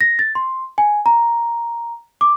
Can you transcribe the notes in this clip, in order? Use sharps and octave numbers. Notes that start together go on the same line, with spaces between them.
A#6
A6
C6
G#5
A#5
D6